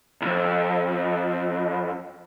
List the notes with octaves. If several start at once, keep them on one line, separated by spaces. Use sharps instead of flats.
C2 F2